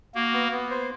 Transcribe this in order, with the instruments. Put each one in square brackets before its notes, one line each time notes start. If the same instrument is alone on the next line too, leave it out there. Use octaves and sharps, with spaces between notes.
[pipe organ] A#3 [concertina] F#4
[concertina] B3
B3
C5